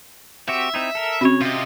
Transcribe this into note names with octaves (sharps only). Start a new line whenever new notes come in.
C4 F#4 G4 E5
C4 D#4 E4
A4 A#4
C#3 C4 C#4 F#4 C#5
C3 F4 D#5